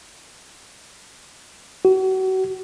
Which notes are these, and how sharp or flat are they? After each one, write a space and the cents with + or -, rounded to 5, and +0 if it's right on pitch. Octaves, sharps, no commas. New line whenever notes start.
F#4 +35